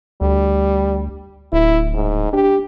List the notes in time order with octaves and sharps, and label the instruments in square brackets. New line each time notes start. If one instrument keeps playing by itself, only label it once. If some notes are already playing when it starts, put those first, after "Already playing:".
[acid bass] D2 [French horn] G3
[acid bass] D1 [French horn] E4
[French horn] G#2
[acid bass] D4 [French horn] G4